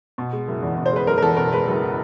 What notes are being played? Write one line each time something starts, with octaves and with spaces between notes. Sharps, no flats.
B2
G#3
F#1
E2
B2
C5
G#3 B4
F#1 A#4
A#4
E2 A4
B2 A#4
G#3 B4
F#1